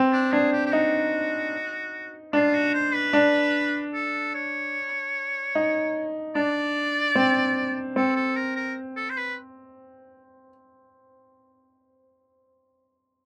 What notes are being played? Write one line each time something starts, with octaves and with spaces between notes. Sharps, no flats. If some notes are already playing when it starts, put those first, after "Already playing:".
Already playing: C4
D4
D4 G#4
G4
G4
D#4 F#4
D4 F4
F#4
C5
B4
D4
A4
C#5
D#4
D4 D5
C4
C4 A4
A4
A#4
A#4
A4
C5
B4